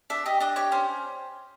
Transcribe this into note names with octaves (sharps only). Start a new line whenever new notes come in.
D4 E5
G4 D#5
D4 D#5
G4 C#5
C#4 C5